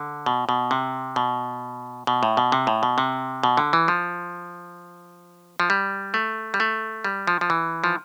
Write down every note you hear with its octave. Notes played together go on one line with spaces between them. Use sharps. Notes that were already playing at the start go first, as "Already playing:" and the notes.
Already playing: D3
B2
B2
C3
B2
B2
A2
B2
C3
A2
B2
C3
B2
D3
E3
F3
F3
G3
A3
G3
A3
G3
F3
F3
E3
F3